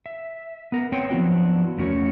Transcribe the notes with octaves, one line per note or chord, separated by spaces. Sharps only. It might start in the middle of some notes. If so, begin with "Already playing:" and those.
E5
B3 A#4
B3 C4 C#5 G5
F3 F#3 B3 D4 E4 F#4
E2 A3 C#4 F#4 A#4 C#5